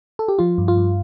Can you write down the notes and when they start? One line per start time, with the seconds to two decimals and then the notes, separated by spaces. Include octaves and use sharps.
0.19 A4
0.28 G4
0.39 F3 F4
0.58 G2
0.68 F4
0.77 G2